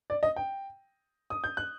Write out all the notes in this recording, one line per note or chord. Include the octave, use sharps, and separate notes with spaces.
D5
D#5
G5
D#6
G6
F#6